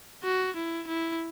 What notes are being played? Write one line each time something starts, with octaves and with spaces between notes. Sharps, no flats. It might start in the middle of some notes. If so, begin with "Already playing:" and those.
F#4
E4
E4